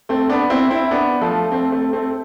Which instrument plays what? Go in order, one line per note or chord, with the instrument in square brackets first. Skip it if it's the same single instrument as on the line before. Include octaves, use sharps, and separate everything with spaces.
[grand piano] A3 C4
B3 D4
C4 E4
C4 E4
B3 D4
F3 A3
A3 C4
A3 C4
A3 C4